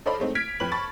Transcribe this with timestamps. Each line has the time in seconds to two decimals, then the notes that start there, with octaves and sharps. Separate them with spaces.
0.06 A4 C5 D5 D#5 F5 B5
0.19 G#3 A3 C4 D#4
0.35 F6 G#6 B6 D7
0.60 F2 B4 B5 F#7
0.72 A5 B5 C#6 A6